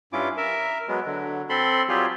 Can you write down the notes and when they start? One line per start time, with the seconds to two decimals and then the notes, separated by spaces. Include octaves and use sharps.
0.13 G2 C#4 E4 F4 D6
0.37 A#4 E5
0.88 F#3 G#3 B3
1.06 D3 F#3
1.49 C4 A4 B5 C6
1.89 F#3 G3 C4 F4 G4 G#4